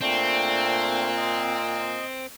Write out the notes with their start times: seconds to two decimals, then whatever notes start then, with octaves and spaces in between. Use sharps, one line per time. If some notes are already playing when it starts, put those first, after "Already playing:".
0.01 A#2 A3 C4 D4 G5
1.17 D#5